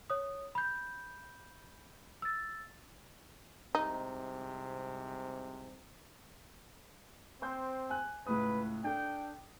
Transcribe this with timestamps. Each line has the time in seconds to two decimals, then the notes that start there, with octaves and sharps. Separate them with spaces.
0.10 C#5 D#6
0.55 B5 G6
2.22 E6 A6
3.75 C2 G#2 C3 D#4
7.42 C4 C5 C6 G6
7.90 G#5 F#6
8.27 C#2 A2 B4 D#6
8.84 D4 A4 G5